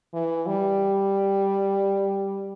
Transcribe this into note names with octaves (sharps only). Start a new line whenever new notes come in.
E3
G3